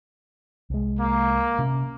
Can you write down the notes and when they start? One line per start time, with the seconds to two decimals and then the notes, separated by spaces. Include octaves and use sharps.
0.70 C2 G#3
0.99 A#3
1.59 C3 C#4